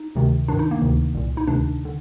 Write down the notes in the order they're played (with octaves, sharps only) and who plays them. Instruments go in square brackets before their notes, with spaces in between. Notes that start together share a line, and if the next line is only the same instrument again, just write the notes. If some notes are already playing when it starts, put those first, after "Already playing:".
Already playing: [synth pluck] D#4
D2 C3 D#3
G2 D#3 D4
D#4
A#3
D2 C3 D#3
C2 A#2
D#4
D2 C3 D#3 D4
D3